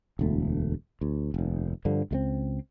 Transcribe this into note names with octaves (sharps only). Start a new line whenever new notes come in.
E1 D2 A3
D2
F1 D#2
G2 D3 F3
C#2 G#3 C4